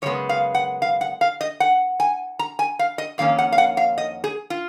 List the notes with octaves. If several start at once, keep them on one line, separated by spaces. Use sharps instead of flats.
F#2 C#3 G#3 B3 C#5
F5
F#5
F5
F#5
F5
D#5
F#5
G#5
A#5
G#5
F5
D#5
F2 D#3 A#3 C#4 F5
F#5
F5
F#5
F5
D#5
G#4
F4